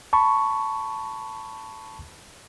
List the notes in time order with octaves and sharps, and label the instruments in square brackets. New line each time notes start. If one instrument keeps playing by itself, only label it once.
[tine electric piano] A5 B5 C#6